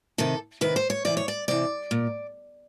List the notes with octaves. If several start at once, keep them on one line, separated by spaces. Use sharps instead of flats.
C3 D#3 A4
C3 D#3 B4
C5
C#5
C3 E3 D5
C#5
D5
C3 E3 D5
A#2